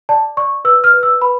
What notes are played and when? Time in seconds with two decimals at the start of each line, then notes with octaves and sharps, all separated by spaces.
0.09 D5 A5
0.37 D5 C#6
0.65 B4 E6
0.84 F6
0.94 B4
1.03 E6
1.21 B4 B5